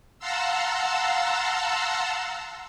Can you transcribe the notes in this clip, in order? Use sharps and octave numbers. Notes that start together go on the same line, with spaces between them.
F5 F#5 A5 A#5 C6 E6